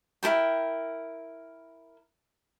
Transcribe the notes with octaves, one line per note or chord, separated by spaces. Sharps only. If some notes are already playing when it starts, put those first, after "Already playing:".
E4 G4 A#4 G5